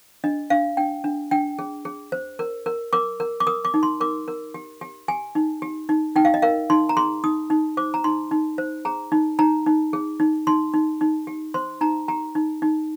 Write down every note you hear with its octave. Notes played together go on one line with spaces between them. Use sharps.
D4 D#5
D4 F5
D4 G5
D4
D4 G5
G#4
G#4
C5
A#4
A#4
A#4 D6
A#4
D6
A#4 D#6
D6
D#4
C6
A#4 D6
A#4
G4
G4
G4 G#5
D#4
G4
D#4
D#4 G5
F5
D#5
A#4 F5
D#4 C6
A#5
G#4 C6
D#4 D#6
D#4
C5 D6
A#5
D#4 C6
D#4
C5
G#4 A#5
D#4
D#4 A#5
D#4
G#4
D#4
D#4 C6
D#4
D#4
G4
C5 C6
D#4 A#5
G4 A#5
D#4
D#4